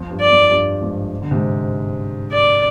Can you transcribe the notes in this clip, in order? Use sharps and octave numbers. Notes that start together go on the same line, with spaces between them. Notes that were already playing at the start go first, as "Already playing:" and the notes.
Already playing: F2
G2
D5
F2
G2
F2 G#2
D3
G#2 C3
D5